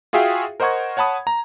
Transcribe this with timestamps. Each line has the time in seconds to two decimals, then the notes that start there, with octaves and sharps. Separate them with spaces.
0.13 F4 F#4 G#4 E5 F5 G5
0.60 A#4 C5 D#5 F#5 C#6 G#6
0.97 C#5 F#5 A5 B5 D#6
1.27 A#5